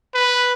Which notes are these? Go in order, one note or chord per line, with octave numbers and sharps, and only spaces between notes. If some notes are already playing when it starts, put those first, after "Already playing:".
B4